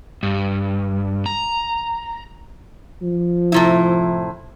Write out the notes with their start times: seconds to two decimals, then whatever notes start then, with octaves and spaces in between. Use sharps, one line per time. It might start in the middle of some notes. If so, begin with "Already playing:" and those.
0.23 G2
1.26 A#5
3.02 F3
3.52 A2 C3 E4